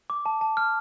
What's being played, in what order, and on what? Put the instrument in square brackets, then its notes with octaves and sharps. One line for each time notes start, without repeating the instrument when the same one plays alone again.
[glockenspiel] D6
A5
A5
F6